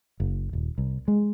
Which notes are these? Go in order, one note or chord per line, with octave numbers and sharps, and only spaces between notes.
F#1
D#1
C2
G#3